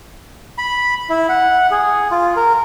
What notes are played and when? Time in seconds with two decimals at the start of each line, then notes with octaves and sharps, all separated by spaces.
0.58 B5
1.10 E4
1.29 F#5
1.71 G#4
2.11 F4
2.36 A#4